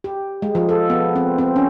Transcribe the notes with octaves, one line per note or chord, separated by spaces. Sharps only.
G4
G#3
F3
A4
B3
C4
C4
C#4